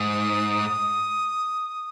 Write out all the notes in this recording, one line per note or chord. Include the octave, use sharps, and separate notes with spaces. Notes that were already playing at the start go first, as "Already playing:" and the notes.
Already playing: G#2 D#6